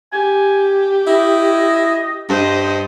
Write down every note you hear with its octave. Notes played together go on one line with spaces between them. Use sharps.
G4 G#5
E4 D#5
G2 C5 D#5